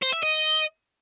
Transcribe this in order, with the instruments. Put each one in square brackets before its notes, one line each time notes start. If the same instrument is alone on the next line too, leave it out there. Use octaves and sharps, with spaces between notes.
[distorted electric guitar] C5
E5
D#5